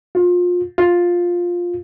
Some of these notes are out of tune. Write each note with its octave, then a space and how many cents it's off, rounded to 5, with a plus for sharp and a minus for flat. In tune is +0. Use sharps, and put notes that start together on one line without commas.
F4 +30
F4 +10